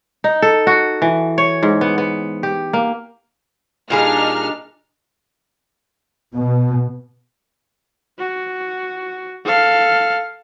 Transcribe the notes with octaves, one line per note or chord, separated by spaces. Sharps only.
D#4
A4
F#4
E3
C#5
G#2
B3
B3
G4
A#3
A#2 G3 D4 D#4 G#4 F6
B2
F#4
A4 F5